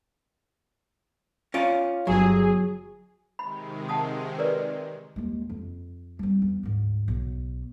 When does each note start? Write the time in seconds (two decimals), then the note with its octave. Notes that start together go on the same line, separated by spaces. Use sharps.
1.54 C#4 F4 D5
2.07 G1 F#3 G#4
3.39 C3 D#3 G#3 B5
3.89 F#5 A5 D#6
4.39 A#4 B4 D5
5.16 D#2 G#3
5.50 F2
6.19 G3 C4
6.42 E2
6.63 D2 G#2
7.08 B1